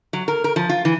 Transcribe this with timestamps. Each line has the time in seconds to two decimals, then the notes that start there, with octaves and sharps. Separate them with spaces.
0.13 F#3
0.28 A#4
0.44 A#4
0.56 F3
0.69 F4
0.85 E3